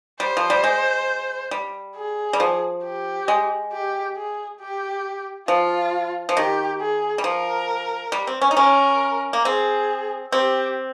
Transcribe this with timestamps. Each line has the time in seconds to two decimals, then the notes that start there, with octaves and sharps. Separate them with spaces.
0.20 G3 C5
0.37 F3
0.50 G3
0.64 G#3
1.51 G3
1.96 G#4
2.33 G3
2.40 F3
2.84 G4
3.28 G#3
3.72 G4
4.17 G#4
4.60 G4
5.48 F3 F4
6.29 F3
6.36 D#3 G4
6.81 G#4
7.18 G3
7.24 F3 A#4
8.12 G3
8.27 C4
8.42 C#4
8.51 D#4
8.57 C#4 A#4
9.33 A#3
9.45 C4 G#4
10.32 C4 G4